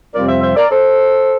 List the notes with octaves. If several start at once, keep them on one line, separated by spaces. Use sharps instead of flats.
F2 C3 G3 C4 F4 A#4 D5
C5 E5
C5 E5
A#4 D5
A4 C5